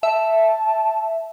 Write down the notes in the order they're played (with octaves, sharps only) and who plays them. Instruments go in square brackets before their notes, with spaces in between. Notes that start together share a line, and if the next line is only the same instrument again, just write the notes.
[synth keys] E5 [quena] A5